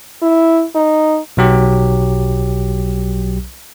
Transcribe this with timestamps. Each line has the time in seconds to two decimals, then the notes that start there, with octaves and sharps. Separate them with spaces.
0.22 E4
0.75 D#4
1.37 B1 F#3 G4